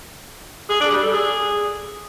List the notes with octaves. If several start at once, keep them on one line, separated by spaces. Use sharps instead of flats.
G#4
D4
G3
A4
G#4